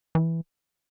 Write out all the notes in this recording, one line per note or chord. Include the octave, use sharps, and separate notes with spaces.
E3